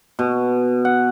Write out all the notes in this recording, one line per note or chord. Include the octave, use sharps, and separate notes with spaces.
B2
F#5